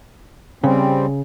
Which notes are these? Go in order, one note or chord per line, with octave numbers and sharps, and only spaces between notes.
C#3 G3 C4